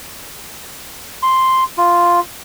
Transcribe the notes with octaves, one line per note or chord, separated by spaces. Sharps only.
C6
F4